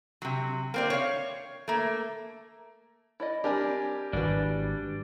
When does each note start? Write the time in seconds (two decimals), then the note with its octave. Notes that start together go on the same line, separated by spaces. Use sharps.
0.22 C3 F#3
0.74 A#3 C4 D5
0.90 C#5 F5
1.68 A3 A#3
3.20 E4 D5 D#5
3.44 G3 C4 D4 G4 A#4 G#5
4.13 G#1 G3 D4 E4 F#4 B4